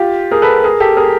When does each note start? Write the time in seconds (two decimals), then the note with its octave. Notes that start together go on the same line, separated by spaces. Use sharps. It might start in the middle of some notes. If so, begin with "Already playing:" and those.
Already playing: F4 G4
0.31 G#4 A#4
0.42 A4 B4
0.64 G#4 A#4
0.80 G4 A4
0.97 G#4 A#4